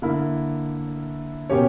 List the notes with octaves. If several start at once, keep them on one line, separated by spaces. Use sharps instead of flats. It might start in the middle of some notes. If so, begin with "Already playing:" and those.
D3 A#3 E4
B2 A#3 C#4 G4 C#5